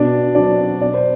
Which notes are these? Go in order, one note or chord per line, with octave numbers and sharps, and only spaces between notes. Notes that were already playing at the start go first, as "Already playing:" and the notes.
Already playing: B2 D4 D5
F#3 C4 D4 D5
B2 D5
C5